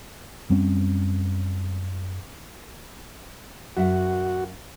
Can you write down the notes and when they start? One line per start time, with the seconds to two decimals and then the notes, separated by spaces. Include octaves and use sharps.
0.50 F#2 G3 C4 C#4
3.76 F#2 F#4 E5 F#5